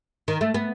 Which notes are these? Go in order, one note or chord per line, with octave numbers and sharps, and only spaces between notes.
D#3
A3
B3